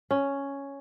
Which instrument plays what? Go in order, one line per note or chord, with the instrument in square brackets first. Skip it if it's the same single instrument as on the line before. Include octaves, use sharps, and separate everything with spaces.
[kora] C#4